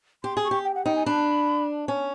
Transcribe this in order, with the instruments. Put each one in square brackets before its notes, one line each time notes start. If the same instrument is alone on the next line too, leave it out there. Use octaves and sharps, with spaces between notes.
[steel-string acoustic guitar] G4 [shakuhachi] C6
[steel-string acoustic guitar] G#4
[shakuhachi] C#6
[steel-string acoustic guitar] G4
[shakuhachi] G5
F#5
[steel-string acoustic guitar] D#4 [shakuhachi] G5
[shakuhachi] G#5
[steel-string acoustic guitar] D4 [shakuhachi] B5
[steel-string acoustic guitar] C#4